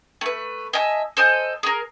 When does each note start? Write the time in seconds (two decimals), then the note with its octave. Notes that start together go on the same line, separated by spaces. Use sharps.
0.21 A3 B4
0.73 D#5 E5 G#5 A5
1.17 A4 C5 D#5 G#5
1.63 G#4 A#4